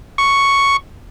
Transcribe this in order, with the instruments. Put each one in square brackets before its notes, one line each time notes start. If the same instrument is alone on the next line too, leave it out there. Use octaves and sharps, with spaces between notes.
[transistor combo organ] C#6